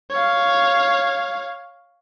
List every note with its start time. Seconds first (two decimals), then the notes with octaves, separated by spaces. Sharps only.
0.11 C#5 F5